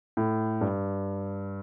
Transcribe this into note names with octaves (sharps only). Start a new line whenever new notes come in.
A2
G2